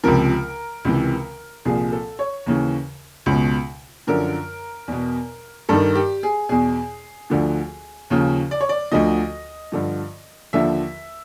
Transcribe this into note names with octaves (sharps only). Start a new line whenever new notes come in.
C#2 C3 F3 A#4
C#2 C3 E3
C2 A#2 F3 G#4
A4
C#5
D#2 C#3 E3
C#2
B2
F#2 D3 F3 A#4
E2 B2
G2 D#3 A4
G4
G#4
E2 B2 G#4
D2 D3 F3
D#2 C#3 F3
D5
C#5
D5
D2 D3 F3 D#5
G2 D3 F3
D#2 D3 F3 E5